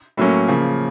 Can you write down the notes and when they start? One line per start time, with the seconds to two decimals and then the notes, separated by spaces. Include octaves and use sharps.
0.17 A2 F#3 A#3 C#4
0.48 C#3 F3 A#3